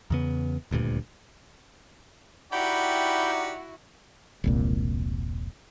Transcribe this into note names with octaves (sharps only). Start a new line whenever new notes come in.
E2 C#3 B3
D#1 D2 G2 A#2
D#4 E4 F#4 G4 D5 F#5 G5 B5
E1 C2 A#2